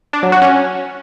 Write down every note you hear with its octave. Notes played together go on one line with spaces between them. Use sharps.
D4
F#3
F#4
C#4